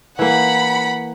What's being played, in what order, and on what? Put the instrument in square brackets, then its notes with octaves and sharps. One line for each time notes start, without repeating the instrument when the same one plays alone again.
[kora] E3 A#3 [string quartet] F#5 B5